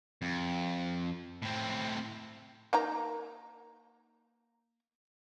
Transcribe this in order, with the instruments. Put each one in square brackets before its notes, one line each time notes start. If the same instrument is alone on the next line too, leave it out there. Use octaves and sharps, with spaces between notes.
[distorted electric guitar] F2
A2 C4
[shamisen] A#3 D#4 A#5